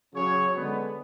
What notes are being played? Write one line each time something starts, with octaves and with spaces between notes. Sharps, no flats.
C#3 F#3 C#4 G#4 C#5
D3 G#3 B3